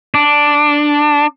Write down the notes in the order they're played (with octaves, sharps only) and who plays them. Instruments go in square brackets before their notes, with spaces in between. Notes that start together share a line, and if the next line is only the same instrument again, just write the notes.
[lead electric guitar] D4